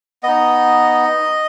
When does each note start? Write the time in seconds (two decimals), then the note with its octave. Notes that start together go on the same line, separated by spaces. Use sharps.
0.23 B3 D#4 D#5